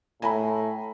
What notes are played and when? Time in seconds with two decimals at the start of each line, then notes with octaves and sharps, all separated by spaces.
0.22 A2 G#5 A#5 B5